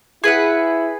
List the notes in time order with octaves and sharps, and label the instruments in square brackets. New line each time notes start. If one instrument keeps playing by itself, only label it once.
[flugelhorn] E4 [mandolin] G#4 B4 F#5